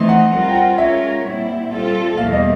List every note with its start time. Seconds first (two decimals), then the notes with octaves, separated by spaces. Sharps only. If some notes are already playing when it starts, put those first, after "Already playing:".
Already playing: E3 A3 C4 D#4 C6
0.09 F#5
0.32 G3 C4 F4 A#4 F#5
0.49 G5
0.55 F#5
0.78 G#3 C#4 F4 A#4 C#5 E5
1.25 A#2 G3 C4 E4
1.71 G3 C4 F4 A4
2.17 E2 B2 G3 A#3 F5
2.33 D#5